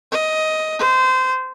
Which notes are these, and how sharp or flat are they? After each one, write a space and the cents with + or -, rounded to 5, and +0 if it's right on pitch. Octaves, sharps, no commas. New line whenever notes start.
D#5 +10
C5 -20